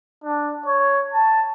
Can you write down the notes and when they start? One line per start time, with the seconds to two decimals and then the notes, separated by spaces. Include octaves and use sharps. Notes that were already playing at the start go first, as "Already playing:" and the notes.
0.24 D4
0.66 C#5
1.13 A5